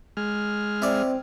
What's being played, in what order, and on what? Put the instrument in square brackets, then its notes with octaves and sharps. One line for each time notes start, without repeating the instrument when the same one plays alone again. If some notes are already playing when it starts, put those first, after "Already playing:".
[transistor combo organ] G#3 F6
[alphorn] C4 [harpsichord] E4 D5